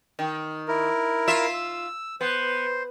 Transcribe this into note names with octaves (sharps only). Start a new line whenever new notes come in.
D#3
E4 A#4
F4 E5
E6
B3 C5